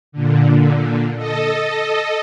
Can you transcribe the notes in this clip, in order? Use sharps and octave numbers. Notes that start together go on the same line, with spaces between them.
A#2 D3
A4 D#5